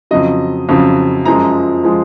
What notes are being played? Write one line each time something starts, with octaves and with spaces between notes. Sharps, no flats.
F2 C#3 F#3 D#5
F2 C#3 F#3
F#2 F3 G#3 A#5
F3 G#3